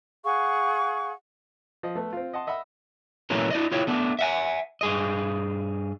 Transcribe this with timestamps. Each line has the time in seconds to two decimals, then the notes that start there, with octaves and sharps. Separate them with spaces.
0.24 G#4 F5 F#5 C#6
1.83 F3 D#5
1.95 A3 B3 A4
2.13 C4 F4
2.33 D#5 F#5 A5 C6
2.47 D#5 E5 F#5 B5 D#6 E6
3.30 A#2 E3 F#3 A3 C#4 A#4
3.50 E4 D5 D#5
3.72 E4 F4 G4 C#5
3.87 A3 B3 D4
4.19 E5 F#5 G#5
4.81 G2 G#4 D#5